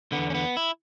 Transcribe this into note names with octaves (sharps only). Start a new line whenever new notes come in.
E2 D3 B3
C#4
B3
E4